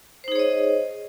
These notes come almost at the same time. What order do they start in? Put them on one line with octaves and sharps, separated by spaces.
C5 D#4 G#4 C#5 D#5